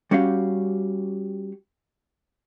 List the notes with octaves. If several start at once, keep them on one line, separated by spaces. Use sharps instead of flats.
G3 C#4 F#4 G4 F5